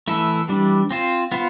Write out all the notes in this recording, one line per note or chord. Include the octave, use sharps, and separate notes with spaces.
E3 A3 E4 A4
E3 G3 D4
C4 F4 C5
B3 F4 C5